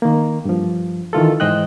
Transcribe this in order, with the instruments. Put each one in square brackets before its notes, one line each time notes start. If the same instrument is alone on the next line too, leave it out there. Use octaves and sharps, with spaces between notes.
[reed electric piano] D#3 A#3
G2 F3
D#3 E3 F4 A4
G#2 E3 C5 D#5 G5 F#6